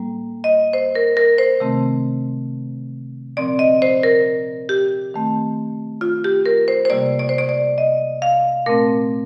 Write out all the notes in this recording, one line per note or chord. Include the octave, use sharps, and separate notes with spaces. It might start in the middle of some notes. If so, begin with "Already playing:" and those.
Already playing: A2 G3 A#3
D#5
C5
A#4
A#4
C5
C3 D#3 A3 C4
A#2 F3 C4 D5
D#5
C5
A#4
G4
D#3 A3 C4
F4
G4
A#4
C5
C5
C3 G3 A#3 D5
D5
C5
D5
D5
D#5
F5
A#2 A3 C4 A#4